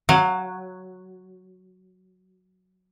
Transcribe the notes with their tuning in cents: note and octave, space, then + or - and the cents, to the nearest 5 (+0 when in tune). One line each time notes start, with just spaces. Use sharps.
F#3 +0 F5 +30